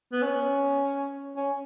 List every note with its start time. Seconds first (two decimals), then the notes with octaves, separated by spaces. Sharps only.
0.12 B3
0.22 C#4
1.36 C#4